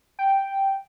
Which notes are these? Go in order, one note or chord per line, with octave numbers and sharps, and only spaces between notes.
G5